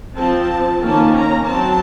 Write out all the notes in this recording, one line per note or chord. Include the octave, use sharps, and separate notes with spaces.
F3 C4 A5
D#3 A#3 C#4 A5
A#5
F#3 C4 A5